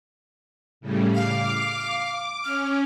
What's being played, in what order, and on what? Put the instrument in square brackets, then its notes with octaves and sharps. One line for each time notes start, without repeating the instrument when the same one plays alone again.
[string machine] A2 C#3 G3
[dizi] F5 [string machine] D6
[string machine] C#4 [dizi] F6